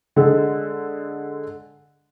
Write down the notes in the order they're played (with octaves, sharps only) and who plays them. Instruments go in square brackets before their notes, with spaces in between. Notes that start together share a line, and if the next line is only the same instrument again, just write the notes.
[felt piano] D3 G#3 A4